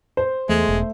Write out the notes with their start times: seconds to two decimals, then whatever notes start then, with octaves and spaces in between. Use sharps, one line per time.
0.17 C5
0.49 E2 G#3 A3
0.69 E1